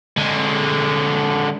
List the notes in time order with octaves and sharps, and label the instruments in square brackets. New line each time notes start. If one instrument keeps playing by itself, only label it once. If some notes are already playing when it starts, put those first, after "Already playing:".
[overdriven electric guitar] D3 G#3